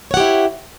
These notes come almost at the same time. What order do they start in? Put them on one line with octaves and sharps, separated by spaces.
C#5 F#5 G4 E4